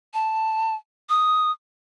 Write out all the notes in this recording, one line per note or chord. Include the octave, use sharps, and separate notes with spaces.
A5
D#6